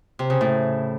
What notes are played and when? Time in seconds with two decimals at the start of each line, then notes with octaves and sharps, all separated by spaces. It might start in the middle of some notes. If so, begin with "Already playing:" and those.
0.19 C3
0.30 C#3
0.41 A2